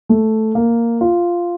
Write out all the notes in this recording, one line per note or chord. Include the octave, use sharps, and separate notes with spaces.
A3
A#3
F4